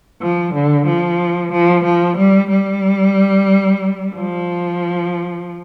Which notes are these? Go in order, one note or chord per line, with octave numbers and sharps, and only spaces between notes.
F3
D3
F3
F3
F3
G3
G3
F3